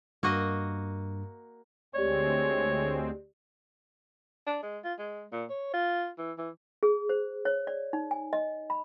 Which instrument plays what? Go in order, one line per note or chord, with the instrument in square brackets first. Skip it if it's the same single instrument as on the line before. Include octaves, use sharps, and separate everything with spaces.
[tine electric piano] G2 [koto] A#3 F#4 D#5
[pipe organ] D2 G#3 C4 [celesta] G4 D5 [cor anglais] C#5
[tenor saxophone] D4
G#3
F4
G#3
A#2
C#5
F4
E3
E3
[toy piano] G#4
C5
C#5
D5
D#4
G#5
D#5
B5